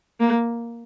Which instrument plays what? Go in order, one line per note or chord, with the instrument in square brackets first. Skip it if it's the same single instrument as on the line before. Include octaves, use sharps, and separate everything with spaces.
[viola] A#3